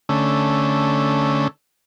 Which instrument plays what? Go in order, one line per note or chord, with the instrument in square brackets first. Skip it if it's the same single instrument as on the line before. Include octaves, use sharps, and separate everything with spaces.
[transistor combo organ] D3 A3 C#4